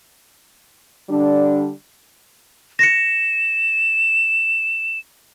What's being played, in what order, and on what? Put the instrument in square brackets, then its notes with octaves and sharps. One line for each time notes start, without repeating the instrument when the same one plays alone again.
[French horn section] D3 G3 D4
[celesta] A#6 C#7 [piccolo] E7